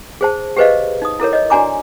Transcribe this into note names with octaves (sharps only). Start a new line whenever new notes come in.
G#4 C5 A5
G4 G#4 B4 C5 D#5 F5
D#4 D#6
E4 A4 A#4 C#5
C#5 D#5
D4 F#4 D5 G#5 A#5 D6